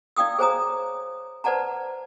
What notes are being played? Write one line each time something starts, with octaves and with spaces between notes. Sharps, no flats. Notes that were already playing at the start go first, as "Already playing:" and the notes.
E4 D5 F5 G5 D#6 E6
G#4 C5 C#5 G#5 A#5 D#6
B4 C5 D5 F#5 A5 A#5